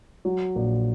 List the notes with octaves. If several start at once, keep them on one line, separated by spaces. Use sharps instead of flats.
F#3
A#1